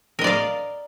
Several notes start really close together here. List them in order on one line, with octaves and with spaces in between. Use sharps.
A#4 D#5 D5 F5